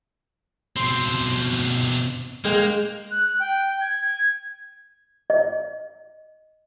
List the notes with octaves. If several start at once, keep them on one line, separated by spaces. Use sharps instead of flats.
B2 C4 C6
G#3 A#3 G#4 G5
F#6
G5
G#6
G#6
D#5